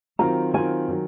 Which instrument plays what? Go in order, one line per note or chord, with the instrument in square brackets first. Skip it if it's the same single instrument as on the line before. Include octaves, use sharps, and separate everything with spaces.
[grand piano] D#3 F#3 C4 F4 [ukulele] A#5
[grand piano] D#3 F#3 C4 F4 [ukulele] G#5
[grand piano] D#3 F#3